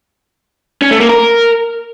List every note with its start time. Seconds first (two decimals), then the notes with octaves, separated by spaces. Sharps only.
0.82 C#4
0.91 A3
1.00 A#3
1.09 A#4